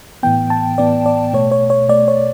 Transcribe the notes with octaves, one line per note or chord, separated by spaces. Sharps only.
A2 E3 B3 G5
A5
A2 E3 B3 D5
D5
B2 A3 C#5
C#5
C#5
B2 A3 D5
C#5